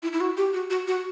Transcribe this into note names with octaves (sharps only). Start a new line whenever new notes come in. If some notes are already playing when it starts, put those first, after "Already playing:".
E4
E4
F#4
G4
F#4
F#4
F#4